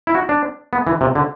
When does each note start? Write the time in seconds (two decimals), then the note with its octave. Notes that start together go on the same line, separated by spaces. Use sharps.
0.07 E4
0.15 F#4
0.29 D4
0.73 B3
0.87 E3
1.01 C3
1.15 D3